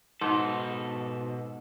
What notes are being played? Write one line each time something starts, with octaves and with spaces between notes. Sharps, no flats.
G#2 B2 A4